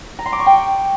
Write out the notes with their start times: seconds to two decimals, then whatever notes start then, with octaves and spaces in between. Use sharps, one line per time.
0.19 A#5
0.26 C6
0.32 D6
0.39 C#6
0.46 G5